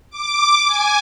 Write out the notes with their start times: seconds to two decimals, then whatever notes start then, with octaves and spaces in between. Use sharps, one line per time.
0.10 D6
0.67 G#5